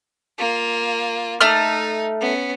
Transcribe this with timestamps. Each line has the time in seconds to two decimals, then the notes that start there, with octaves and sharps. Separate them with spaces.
0.38 A#3 F4
1.41 A3 D#4 F6
2.21 B3 C#4